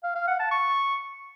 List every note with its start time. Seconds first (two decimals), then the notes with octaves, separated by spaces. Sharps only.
0.04 F5
0.16 F5
0.28 F#5
0.40 A5
0.52 C#6